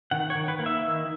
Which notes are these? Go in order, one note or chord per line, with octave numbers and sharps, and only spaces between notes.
D#3 F#5
C#5
D#3
B4
A#3
E5
D#3